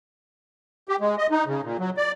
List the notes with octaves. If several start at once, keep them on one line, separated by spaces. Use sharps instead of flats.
G4
G#3
D#5
D#4
C#3
A#2
F#3
D5